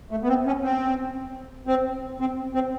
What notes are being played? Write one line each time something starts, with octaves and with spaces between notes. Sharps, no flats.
A3
B3
C4
C#4
C4
C4
C4
C4